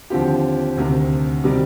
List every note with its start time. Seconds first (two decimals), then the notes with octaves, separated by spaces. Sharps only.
0.10 D#2 D3 F3 C4 G4
0.77 D2 C3 D#3
1.44 C3 D#3 G3